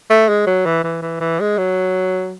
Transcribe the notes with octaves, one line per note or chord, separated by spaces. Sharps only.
A3
G#3
F#3
E3
E3
E3
E3
G#3
F#3